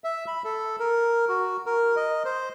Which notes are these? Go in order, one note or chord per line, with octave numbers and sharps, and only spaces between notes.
E5
B5
A4
A#4
F#4
A#4
D#5
C5